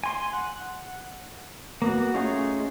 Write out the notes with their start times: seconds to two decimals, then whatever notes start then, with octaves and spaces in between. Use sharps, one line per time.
0.04 G#5 C6
0.33 F#5
1.82 A#3 B3 F#4
2.14 A3 C#4 D#4 F4 G#4